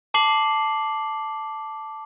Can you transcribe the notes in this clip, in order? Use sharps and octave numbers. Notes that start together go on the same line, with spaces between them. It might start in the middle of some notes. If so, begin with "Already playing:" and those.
A5 D6 C7 F#7